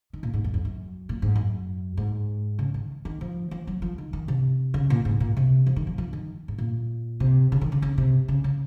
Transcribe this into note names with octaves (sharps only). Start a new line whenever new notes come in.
D#3
A#2
G#2
F#2
F2
F#2
A#2
G#2
F#2
G#2
C#3
D#3
D#3
F3
F3
F#3
F3
D#3
D#3
C3
C#3
A#2
G#2
A#2
C3
F3
D#3
F3
F3
D#3
G#2
A#2
C3
C#3
D#3
C#3
C#3
C3
C#3
C#3